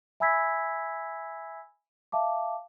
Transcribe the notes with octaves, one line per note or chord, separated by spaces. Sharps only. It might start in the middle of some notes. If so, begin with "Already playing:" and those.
E5 G#5 B5 E6 G#6 B6
E5 F5 A5 D6